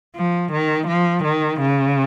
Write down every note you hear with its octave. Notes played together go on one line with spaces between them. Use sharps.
F3
D#3
F3
D#3
C#3